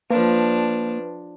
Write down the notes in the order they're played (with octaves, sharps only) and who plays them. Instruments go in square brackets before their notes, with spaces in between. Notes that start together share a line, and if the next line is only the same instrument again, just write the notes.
[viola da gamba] F3 D4 [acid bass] A#3 [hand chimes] B4